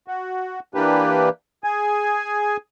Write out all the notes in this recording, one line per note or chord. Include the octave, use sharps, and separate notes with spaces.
F#4
E3 A#3 D4 G4 B4
G#4 G#5